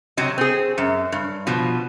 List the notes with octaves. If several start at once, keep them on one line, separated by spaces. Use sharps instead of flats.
C3 F#3 C4 D#5
C4 G#4
F#2
G2
B2 F3